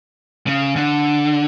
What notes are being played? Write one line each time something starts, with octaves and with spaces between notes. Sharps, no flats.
C#3
D3